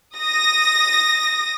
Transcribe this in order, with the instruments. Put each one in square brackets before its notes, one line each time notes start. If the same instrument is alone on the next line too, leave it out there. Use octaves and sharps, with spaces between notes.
[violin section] D#6 A#6